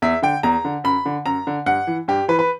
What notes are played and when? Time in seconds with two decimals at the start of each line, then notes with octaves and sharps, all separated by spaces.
0.02 E2 E5
0.22 D3 G5
0.43 E2 A#5
0.65 D3
0.84 F#2 B5
1.06 D3
1.26 F#2 A#5
1.47 D3
1.66 G2 F#5
1.87 E3
2.08 G2 G4
2.28 E3 B4
2.39 B4